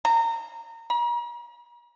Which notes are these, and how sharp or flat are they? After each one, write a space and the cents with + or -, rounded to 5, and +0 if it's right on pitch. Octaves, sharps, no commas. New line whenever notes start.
A#5 -25
A#5 +40